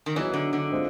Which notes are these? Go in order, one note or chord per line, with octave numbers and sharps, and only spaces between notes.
D#3
E3 F#3 B3 D#4 G#4 C#5
D3
D3
G#3 C4 F4